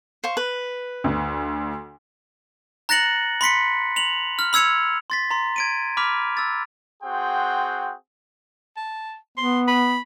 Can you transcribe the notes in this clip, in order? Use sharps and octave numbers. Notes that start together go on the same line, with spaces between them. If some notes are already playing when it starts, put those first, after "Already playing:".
C5 F5 C#6
B4
D2
A#5 F#6 A6 A#6 C#7 F#7
B5 C6 B6 C#7
F7 F#7
F6
B5 E6 G#6 C#7 F7
C6 A6 B6
A#5 C6
G#6 D7 D#7
B5 D6 F6 B6 F7
E6 A6
C4 F#4 G#4 F#5 G5 C6
A5
B3 C6
B5